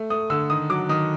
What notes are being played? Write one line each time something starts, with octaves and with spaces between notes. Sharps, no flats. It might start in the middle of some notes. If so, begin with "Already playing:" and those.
Already playing: A3
A3 D#6
D3 E6
D#3 D#6
F#3 D6
D#3 D#6